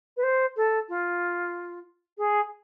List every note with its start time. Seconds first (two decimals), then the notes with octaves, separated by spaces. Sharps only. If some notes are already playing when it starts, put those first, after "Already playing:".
0.17 B4
0.23 C5
0.56 A4
0.89 F4
2.18 G#4